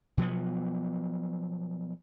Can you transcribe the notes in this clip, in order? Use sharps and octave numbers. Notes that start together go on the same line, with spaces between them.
B2 F3 F#3 B3